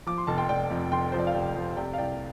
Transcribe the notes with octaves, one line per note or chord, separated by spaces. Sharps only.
F3 D6
C6
F1 A5
G5 C6
F1 D5 G5
F2
F1 G5 C6
F3 C5
D5
F5
F1 D5 G5
F3
C3 D5 G5
F5
C2 D5 G5